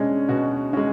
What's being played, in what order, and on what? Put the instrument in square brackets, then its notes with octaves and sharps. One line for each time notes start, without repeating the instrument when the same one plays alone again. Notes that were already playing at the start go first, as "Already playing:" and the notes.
Already playing: [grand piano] B2 G#3 C#4 D4
B2 F#4
G#3 C#4 F#4